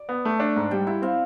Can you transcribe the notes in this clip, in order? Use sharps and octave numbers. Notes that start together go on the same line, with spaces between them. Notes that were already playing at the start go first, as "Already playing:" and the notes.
Already playing: D5
B3
A3
D4
G#2
G3 G5
E4 F#5
C4 F5